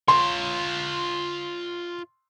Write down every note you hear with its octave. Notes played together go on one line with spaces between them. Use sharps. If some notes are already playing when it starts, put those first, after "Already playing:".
F4 C#5 C6